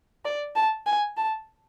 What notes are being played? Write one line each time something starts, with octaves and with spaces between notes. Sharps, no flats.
D5
A5
G#5
A5